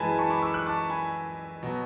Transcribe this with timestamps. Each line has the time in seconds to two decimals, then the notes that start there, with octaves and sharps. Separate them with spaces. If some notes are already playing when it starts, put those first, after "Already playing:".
Already playing: F#2 E3 G#3 G#5 A5 B5
0.19 A5 C#6
0.30 B5 D6
0.42 C#6 E6
0.54 D6 F#6
0.66 A5 C#6
0.90 G#5 B5
1.63 B2 F#3